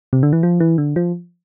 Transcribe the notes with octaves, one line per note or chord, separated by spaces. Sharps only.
C3
D3
E3
F3
E3
D3
F3